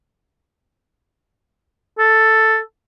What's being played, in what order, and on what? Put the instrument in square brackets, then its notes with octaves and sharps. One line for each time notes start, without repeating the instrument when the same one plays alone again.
[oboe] A4